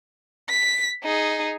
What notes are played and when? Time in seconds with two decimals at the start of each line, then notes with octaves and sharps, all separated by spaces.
0.49 B6
1.03 D#4 G#4